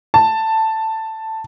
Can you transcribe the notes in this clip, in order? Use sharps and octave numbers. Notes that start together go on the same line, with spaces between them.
A5